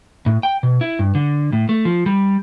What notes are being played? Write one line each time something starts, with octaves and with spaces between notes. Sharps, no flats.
A2
G5
B2
E4
G2
D3
A2
A3
F3
G3